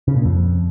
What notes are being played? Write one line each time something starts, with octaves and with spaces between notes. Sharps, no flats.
C#3
A#2
F2